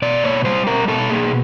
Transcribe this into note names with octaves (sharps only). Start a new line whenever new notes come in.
B2 D5
A#3 C#5
G3 C5
B2 A#4
B2 A4
A#3 G#4